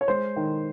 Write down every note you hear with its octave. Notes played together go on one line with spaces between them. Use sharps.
C#5
G#3 C5
D#3